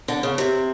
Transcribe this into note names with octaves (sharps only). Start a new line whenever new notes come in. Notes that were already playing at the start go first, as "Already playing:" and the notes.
D3
C#3
C3